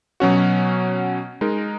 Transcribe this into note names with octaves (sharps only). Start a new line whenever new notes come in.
B2 F#3 C#4 F#4
G#3 D#4 A#4